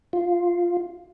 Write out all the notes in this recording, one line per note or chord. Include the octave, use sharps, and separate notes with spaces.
F4